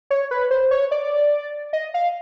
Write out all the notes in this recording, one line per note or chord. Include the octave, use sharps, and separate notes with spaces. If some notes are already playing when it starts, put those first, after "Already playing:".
C#5
B4
C5
C#5
D5
D#5
F5